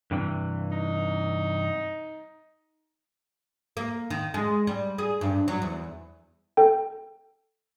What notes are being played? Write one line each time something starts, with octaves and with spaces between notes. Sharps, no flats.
G2 C3 E3
D#4
A#3
D#3
G#3
G3
G#4
G2
F#3
E2
A4 G5